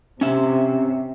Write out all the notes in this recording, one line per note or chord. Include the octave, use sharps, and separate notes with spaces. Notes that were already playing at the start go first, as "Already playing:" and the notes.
C3 C#4 E5